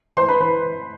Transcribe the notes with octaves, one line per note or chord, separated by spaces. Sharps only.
E3 C5 C6
B4 B5
E3 B4 B5